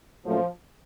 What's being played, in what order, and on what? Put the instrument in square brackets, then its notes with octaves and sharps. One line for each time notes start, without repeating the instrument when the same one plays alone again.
[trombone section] A#2 F#3 A3 C#4 F4 [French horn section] F3